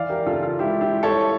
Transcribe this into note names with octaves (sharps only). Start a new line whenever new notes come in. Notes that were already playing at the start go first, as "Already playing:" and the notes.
Already playing: E3 D5 F5
G4 A#4
C#3 F4 A4
F4
C#2 E4 G4
E4 G4
G3
A4 C#5